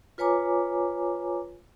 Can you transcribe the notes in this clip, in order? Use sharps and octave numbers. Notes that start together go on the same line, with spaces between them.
F4 B4 C#5 G#5 A#5 D6